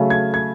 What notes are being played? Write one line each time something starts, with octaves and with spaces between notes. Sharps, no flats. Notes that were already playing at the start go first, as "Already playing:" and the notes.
Already playing: C#3 F#3 A3
G#6
G#6